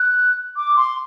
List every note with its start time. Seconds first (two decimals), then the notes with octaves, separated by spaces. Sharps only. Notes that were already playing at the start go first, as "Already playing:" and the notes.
Already playing: F#6
0.56 D6
0.76 C6